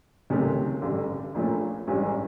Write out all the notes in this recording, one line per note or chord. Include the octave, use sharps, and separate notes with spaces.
C#2 C3 D#3 F#3 A3
A1 G2 D3
A#1 A#2 F3 A3 C#4
A1 G2 E3 G#3 C#4